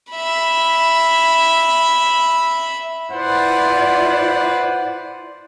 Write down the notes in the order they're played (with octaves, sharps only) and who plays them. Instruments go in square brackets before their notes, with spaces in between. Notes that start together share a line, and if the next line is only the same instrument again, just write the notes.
[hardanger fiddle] E5 B5
[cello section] E4 F4 D5 [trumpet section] B4 C5 F#5